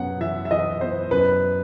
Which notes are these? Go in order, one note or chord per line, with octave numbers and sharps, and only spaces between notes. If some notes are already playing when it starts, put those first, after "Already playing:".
Already playing: F#2 B3 F#5
E3 E5
E5
E3 D#5
B3 C5
F#2 B4